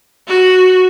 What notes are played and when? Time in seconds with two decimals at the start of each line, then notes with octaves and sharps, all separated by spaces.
0.28 F#4